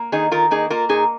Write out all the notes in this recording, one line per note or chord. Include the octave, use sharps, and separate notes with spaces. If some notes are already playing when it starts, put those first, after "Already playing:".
Already playing: A#3
D#3 D#4 G#4
D#3 F4 A#4
A#3 D#4 G#4
A#3 F4 A#4
A#2 D#4 G#4